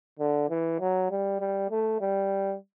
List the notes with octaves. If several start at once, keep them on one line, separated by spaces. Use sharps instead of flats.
D3
E3
F#3
G3
G3
A3
G3